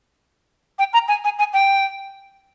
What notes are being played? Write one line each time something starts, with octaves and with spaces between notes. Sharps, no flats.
G5
A#5
G#5
G#5
G#5
G5